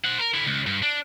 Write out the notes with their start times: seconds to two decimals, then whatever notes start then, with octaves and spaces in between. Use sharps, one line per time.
0.05 C5 F#5
0.20 A#4
0.34 D3 E4
0.47 C#2
0.67 G2
0.83 D4